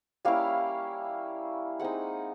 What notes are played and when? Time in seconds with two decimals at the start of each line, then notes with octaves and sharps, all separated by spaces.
0.25 G3 A#3 C#4 E4 F5
1.79 G#3 C4 D#4 F#5